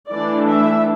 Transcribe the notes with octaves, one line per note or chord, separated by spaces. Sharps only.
E3 A3 D4 D5
E5